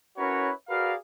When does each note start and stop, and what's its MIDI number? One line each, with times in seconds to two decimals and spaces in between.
0.17 0.52 61
0.17 0.52 64
0.17 0.52 66
0.17 0.52 70
0.17 0.52 71
0.17 0.52 73
0.69 0.94 66
0.69 0.94 68
0.69 0.94 70
0.69 0.94 71
0.69 0.94 74
0.69 0.94 77